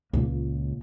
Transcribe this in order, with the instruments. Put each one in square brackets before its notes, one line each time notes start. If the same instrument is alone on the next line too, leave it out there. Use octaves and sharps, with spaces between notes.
[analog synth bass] C#2 [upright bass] A#2 A#3